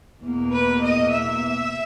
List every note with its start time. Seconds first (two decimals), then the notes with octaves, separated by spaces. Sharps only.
0.23 E2 B2 A#3
0.52 B4
0.82 D#5
1.11 E5